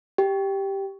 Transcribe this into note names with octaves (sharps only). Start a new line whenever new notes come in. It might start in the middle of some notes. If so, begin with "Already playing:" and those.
G4